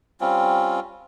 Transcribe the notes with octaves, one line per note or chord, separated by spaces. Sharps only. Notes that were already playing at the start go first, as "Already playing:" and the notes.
G3 C4 C#4 F4